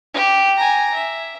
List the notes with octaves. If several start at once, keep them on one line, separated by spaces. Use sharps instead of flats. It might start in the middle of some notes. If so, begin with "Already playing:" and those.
G4
G#5 A#5
E5